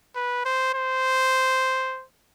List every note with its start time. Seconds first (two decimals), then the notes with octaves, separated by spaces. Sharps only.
0.15 B4
0.45 C5
0.74 C5